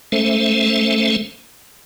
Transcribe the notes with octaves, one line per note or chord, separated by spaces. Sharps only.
G#3 A3 C#4 A4 C5 E5